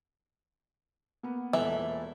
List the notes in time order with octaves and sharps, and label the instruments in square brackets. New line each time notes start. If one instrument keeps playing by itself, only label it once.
[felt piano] A#3 B3
[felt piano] E1 A#2 A4 [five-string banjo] E3 E5